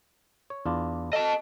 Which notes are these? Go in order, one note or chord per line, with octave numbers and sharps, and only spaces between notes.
C#5
E2 D4 F4
A4 D#5 A5